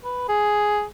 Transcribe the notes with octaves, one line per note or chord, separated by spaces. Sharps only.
B4
G#4